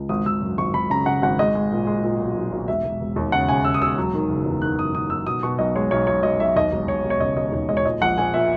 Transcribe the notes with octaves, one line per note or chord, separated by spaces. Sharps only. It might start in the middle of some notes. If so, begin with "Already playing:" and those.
Already playing: C#2
G#1 D#6
G#1 E6
F#2
G#1 C#6
G#1 B5
C#3 A#5
C#3 F#5
G#1 F#5
G#3 D#5
G#3
A#2
G#3
A#2
B1
B1
B1
E1 E5
E1
E1
D#2
C#3 F#5
C#3 G#5
C#3 E6
D#6
E1 E6
F#3
D#3
F#1
E2
D#3 F#6
F#1 D#6
D#3 D#6
F#3 E6
B2 D#6
B2 C#6
B1 D#5
G#3 C#5
B1 C#5
B1 C#5
B1 D#5
B1 E5
D#2 D#5
E1
E1 C#5
E1
C#5
C#3 D#5
E1 D#5
D#2 C#5
G#3 D#5
C#5
A#2 D#5
A#1 F#5
A#1 G#5
A#2 E5